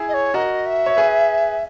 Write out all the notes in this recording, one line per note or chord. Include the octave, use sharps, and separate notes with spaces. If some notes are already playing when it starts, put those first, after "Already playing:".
Already playing: E4 G#4
D#5
C#5
F#4 A#4 D#5
E5
C#5
G#4 B4